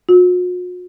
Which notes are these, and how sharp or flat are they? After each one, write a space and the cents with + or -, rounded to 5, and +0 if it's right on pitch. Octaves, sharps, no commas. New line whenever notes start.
F#4 -45